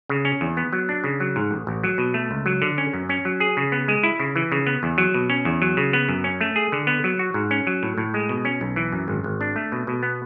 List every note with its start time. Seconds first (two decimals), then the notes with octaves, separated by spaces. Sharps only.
0.09 C#3
0.25 C#4
0.41 E2
0.57 B3
0.73 F#3
0.89 D4
1.04 C#3
1.20 F#3
1.36 G#2
1.51 A1
1.67 A1
1.84 F#3
1.98 B2
2.14 A3
2.31 C#2
2.46 F#3
2.62 D3
2.78 C#4
2.94 F#2
3.09 C#4
3.25 F#3
3.40 G#4
3.57 C#3
3.72 B3
3.88 G#3
4.03 E4
4.20 C#3
4.36 E3
4.52 C#3
4.67 B3
4.83 E2
4.98 F#3
5.14 B2
5.30 C#4
5.45 E2
5.62 F#3
5.77 C#3
5.93 B3
6.09 F#2
6.24 C#4
6.41 A3
6.56 G#4
6.72 D3
6.87 B3
7.04 F#3
7.19 F#4
7.34 G#2
7.51 C#4
7.67 F#3
7.83 A2
7.98 A2
8.14 G#3
8.29 B2
8.45 C#4
8.61 B1
8.76 E3
8.92 F#2
9.08 G#1
9.24 G#1
9.41 D4
9.56 A3
9.72 B2
9.87 B2
10.03 B3